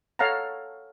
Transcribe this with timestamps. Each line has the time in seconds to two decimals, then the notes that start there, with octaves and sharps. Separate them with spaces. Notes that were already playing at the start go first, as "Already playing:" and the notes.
0.19 A4 C#5 F5 F#5 A5 A#5